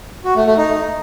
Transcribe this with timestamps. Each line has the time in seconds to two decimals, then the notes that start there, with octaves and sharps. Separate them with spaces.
0.25 F#4
0.36 A3
0.46 A3
0.57 D#4